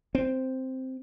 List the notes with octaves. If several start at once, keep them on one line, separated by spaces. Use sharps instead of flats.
C4